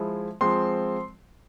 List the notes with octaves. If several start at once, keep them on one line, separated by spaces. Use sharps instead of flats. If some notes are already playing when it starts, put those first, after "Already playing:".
Already playing: F3 G#3 E4
F3 G#3 C4 C6